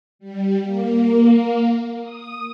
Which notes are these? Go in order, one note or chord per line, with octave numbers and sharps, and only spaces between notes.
G3
A#3
D#6